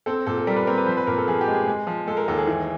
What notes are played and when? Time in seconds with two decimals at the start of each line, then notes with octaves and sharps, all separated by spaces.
0.06 C4 A4
0.27 A#2 A4
0.38 A4
0.47 G3 A#4
0.56 B4
0.67 C4 A#4
0.78 B4
0.86 F3 C5
0.97 B4
1.07 A#2 A#4
1.18 A4
1.28 F3 G#4
1.41 G4
1.48 G#3
1.54 G#4
1.68 G#3
1.87 F3
2.07 G#3 A4
2.17 A#4
2.28 D#2 A4
2.38 G#4
2.47 E3